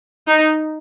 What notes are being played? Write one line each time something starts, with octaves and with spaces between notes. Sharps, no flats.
D#4